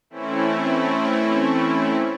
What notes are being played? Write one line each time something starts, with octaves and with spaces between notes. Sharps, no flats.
E3 A3 C4 C#4 E4